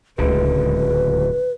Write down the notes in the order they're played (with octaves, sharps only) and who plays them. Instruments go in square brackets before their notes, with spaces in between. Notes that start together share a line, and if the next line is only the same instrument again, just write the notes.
[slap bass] D1 D3 [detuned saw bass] C#2 [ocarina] B4